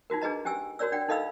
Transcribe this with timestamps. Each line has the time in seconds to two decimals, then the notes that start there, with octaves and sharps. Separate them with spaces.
0.10 D#4 F4 F#4 A#4
0.21 D4 G#4 B4 D#5 A#5
0.45 C#4 G4 G#5 E6
0.79 F#4 A#4 C#5 D5 E6
0.92 D4 D5 F#5 G5
1.08 D#4 A4 D#5 F5 B5 E6